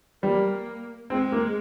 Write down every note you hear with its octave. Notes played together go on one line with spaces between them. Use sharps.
G3 A#3
G#3 C4
A#3